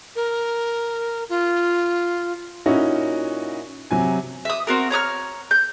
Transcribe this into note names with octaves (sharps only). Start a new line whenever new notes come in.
A#4
F4
A#2 C#4 D#4 E4 F#4
C3 F#3 G#5
E5 D#6
C4 F#4 A#4
C#5 A#5 D#6 F6
G6